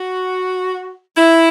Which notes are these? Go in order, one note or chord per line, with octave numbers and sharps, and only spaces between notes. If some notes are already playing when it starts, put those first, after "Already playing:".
Already playing: F#4
E4